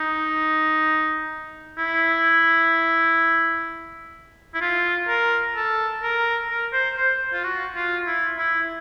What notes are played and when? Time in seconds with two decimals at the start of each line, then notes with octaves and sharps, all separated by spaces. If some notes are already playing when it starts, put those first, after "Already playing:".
Already playing: D#4
1.78 E4
4.54 E4
4.61 F4
5.08 A#4
5.56 A4
6.03 A#4
6.50 A#4
6.73 C5
6.97 C5
7.33 F4
7.44 F#4
7.75 F4
8.07 E4
8.38 E4